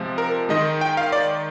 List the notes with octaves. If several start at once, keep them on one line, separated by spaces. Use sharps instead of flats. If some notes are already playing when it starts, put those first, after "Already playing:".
Already playing: C3 F3 G#3
A#4
D#3 G#3 D#5
G5
F5
D5